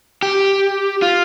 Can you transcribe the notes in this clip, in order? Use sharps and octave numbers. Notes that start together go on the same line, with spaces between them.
G4
F4